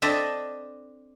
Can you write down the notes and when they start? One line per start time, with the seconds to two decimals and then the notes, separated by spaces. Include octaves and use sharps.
0.02 C4 D4 A4 D#5 E5